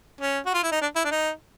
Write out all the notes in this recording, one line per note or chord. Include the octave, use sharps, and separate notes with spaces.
C#4
F#4
F4
E4
D#4
D4
E4
D4
D#4